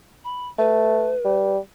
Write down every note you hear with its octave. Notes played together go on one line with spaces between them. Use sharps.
B5
A3 B4
G3